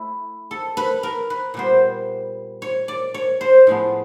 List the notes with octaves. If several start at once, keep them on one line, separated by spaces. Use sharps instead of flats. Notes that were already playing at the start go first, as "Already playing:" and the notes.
Already playing: A3 E4
A4
B4
A#4
B4
A#2 G3 B3 C5
C#5
D5
C#5
C5
A2 F3 G#3 B3